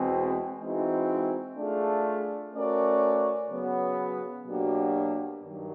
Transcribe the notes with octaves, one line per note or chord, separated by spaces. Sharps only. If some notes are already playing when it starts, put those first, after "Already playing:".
Already playing: E2 B2 G#3 C4
E3 G#3 C4 D#4 F#4
A3 D4 F4 G#4
A3 C#4 F#4 A#4 D5
C#3 F#3 B3
B2 F#3 A#3 D4 G4
G2 D#3 F#3